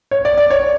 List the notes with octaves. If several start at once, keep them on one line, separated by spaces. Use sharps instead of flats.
C#5
D5
D5
C#5